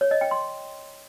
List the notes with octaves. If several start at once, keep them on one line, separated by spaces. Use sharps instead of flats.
C#5
D#5
G5
C6